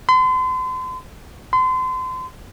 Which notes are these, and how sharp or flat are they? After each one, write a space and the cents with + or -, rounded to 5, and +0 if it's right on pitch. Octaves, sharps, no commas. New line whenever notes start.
C6 -40
C6 -35